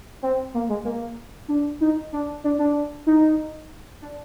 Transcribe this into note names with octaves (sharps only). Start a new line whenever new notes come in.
C4
A#3
G#3
A#3
D4
D#4
D4
D4
D4
D#4
D4